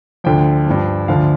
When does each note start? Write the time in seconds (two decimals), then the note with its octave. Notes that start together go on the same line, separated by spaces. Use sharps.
0.24 D2 D3 F3 G5
0.66 G2 F3
1.08 D2 D3 F3 F5